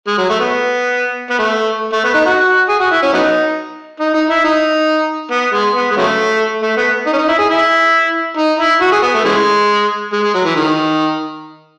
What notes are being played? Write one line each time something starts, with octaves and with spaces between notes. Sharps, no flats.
G#3
F#3
A3
B3
B3
A3
A3
B3
D#4
F#4
G#4
F#4
E4
C#4
F#3 B3 D#4
D#4
D#4
E4
D#4
B3
G#3
B3
G#3
C#3 F#3 A3
A3
B3
D#4
C#4
D#4
E4
G#4
E4
D#4
E4
F#4
G#4
B3
A3
C#3 E3 G#3
G#3
G#3
F#3
E3
D#3